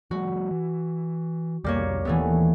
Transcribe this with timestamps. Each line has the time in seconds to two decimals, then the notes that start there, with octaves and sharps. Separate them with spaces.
0.11 F3 G3 A3 F#4
0.51 E3
1.64 C2 F2 G3 A#3 B3 C#5
2.05 D#1 D#2 E3 A3 B3